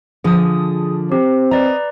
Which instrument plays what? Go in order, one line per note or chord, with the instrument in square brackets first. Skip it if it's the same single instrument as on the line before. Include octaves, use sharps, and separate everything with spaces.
[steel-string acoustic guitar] D3 F3 [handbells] G#4 D#6
[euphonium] C4 [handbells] G4
[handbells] B4 D5 A#5 [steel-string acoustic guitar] D#5